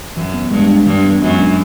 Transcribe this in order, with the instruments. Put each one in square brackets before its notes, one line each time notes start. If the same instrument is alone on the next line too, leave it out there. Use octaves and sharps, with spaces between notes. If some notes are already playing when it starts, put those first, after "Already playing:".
[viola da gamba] F#2 [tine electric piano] E3
[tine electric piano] B3
[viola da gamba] G2 [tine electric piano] G#3
[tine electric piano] D4
[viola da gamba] G2 [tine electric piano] E3
[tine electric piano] B3
[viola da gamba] F#2 [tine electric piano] G#3
[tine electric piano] D4